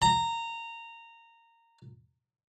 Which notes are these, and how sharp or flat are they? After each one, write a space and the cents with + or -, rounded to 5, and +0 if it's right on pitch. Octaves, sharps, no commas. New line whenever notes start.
A#5 -15